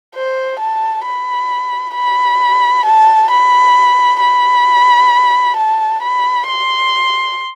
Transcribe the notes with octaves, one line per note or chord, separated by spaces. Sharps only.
C5
A5
B5
B5
A5
B5
B5
A5
B5
C6